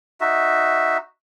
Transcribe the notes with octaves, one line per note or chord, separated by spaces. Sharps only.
D#4 F#4 E5